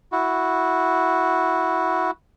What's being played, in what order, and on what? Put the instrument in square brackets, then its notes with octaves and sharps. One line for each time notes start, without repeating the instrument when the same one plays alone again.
[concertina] E4 F#4